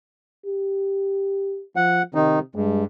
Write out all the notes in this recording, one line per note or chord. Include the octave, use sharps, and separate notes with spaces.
G4
F3 F#5
C3 D#3 D#4
G2 G#3